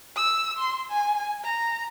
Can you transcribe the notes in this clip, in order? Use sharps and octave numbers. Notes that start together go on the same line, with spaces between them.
E6
C6
G#5
A#5